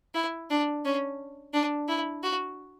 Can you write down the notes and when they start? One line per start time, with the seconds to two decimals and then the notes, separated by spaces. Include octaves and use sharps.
0.14 E4
0.50 D4
0.85 C#4
1.53 D4
1.88 E4
2.23 F#4